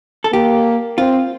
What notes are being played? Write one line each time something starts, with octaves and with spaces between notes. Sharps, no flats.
A4
A#3 G4
C4 F4